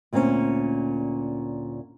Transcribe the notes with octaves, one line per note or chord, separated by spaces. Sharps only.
D2 A#2 A#3 C4 C#4